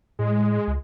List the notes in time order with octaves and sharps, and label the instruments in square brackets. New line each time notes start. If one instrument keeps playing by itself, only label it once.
[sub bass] A2 [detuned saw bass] G#3
[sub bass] C#2